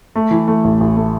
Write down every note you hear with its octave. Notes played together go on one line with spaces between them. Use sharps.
A3
E3
A3
A1
A1
A3